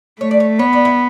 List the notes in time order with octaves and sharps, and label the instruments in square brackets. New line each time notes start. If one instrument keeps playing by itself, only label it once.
[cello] A3 [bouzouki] C#5
[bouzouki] D5
C#5
[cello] B3 [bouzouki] C#5
[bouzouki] D5
E4